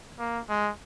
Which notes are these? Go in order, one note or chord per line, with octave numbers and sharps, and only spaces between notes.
A#3
G#3